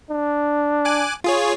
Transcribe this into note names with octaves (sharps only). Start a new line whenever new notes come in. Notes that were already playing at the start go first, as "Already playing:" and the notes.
D4
G#5 D6 F#6
F4 G#4 C#5